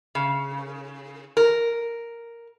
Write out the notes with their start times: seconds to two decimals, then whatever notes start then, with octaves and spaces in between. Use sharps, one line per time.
0.15 C#3
1.37 A#4